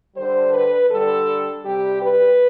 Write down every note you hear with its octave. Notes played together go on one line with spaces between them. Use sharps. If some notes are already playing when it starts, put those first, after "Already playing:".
D3 G3 C5
B4
D3 G3 A4
C3 G3 G4
B4